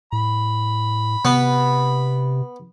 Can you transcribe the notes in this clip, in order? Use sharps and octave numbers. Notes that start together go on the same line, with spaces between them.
A2 B5
C3 B3